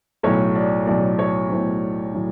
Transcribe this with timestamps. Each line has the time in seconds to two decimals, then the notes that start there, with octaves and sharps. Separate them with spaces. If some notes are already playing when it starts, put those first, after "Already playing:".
0.23 B1 A2 F#3 C#5
0.55 D5
0.87 B1 A2 F#3 D5
1.19 C#5
1.50 B1 A2 F#3 C5
2.14 A2 F#3